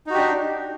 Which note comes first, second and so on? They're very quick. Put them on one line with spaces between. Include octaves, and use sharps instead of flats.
D#4 F#4 G4 D4